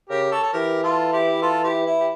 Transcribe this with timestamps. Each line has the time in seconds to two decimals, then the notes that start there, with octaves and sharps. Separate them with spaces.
0.09 C#3 G4 A#4
0.31 A4 C#5
0.43 A4
0.53 E3 G4 A#4
0.83 F4 A4
1.12 E4 G4
1.42 F4 A4
1.64 E4 G4
1.86 E4
2.00 G4